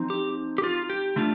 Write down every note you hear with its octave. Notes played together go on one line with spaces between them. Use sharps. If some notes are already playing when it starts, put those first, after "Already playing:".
Already playing: F3 C4 D#4
G4
G4
F4
G4
D3 A3 D4 F4